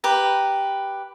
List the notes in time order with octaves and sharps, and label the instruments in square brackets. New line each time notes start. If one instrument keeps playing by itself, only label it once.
[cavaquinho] G4 B4 A#5